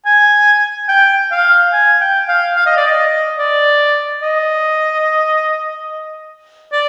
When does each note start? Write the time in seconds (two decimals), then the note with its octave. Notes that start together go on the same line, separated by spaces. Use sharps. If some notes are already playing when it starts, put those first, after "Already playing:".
0.06 G#5
0.89 G5
1.31 F5
1.73 G#5
2.01 G5
2.28 F5
2.56 F5
2.66 D#5
2.77 D5
2.87 D#5
3.39 D5
4.23 D#5
6.73 D5